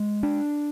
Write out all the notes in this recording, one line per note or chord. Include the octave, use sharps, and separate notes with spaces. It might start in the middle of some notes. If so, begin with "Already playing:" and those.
Already playing: G#3
D4